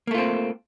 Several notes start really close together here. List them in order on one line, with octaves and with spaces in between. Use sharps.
A#3 A3 F4 C4